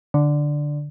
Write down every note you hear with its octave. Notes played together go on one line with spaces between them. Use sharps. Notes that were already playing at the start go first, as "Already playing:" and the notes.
D3